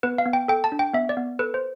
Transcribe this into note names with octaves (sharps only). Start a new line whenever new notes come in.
B3 B4
F5
B3
G5
A4 G5
A5
D4
G5
B3 E5
D5
B3
A4 B4
C5